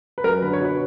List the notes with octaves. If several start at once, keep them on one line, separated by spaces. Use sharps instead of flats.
B4
F#2 A#4
D3 B4
C#5
B2 B4